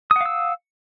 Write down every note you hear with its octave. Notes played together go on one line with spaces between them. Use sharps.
F5 F#5 D#6 E6